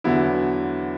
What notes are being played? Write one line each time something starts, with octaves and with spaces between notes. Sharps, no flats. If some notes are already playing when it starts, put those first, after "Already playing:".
E2 D3 F#3 B3 E4